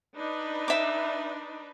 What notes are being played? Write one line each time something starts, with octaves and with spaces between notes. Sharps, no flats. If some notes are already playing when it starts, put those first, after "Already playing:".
D4 D#4 B4
E5 D6